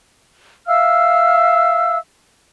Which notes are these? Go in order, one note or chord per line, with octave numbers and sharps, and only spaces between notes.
E5 F5 E6 F6